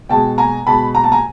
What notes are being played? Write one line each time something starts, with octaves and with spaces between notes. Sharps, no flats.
B2 G#3 G5 A5
G#5 A#5
B2 G#3 A5 B5
A#5
A5
G#5 A#5